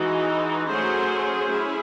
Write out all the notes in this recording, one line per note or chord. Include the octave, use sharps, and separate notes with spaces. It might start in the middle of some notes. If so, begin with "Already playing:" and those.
Already playing: E3 G#3 D#4 F#4
F#3 A3 C#4 G#4 C5
C#4 E4 G#4